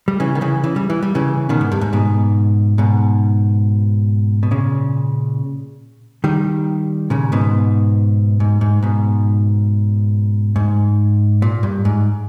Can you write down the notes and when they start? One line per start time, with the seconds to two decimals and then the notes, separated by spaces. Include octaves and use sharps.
0.08 G3
0.20 C#3 E3
0.35 D#3
0.41 C#3 E3
0.64 E3
0.76 G3
0.90 E3
1.03 G3
1.15 C#3 E3
1.49 B2 D#3
1.61 G#2
1.72 G2
1.81 G#2
1.93 G#2 B2
2.78 G#2 B2
4.43 B2
4.51 A#2 C#3
6.24 D#3 G3
7.10 A#2 C#3
7.32 G#2 B2
8.40 G#2
8.61 G#2
8.83 G#2 B2
10.56 G#2
11.42 A#2
11.63 G2
11.85 G#2